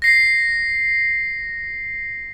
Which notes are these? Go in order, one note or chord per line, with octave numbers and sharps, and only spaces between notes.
A#6 C7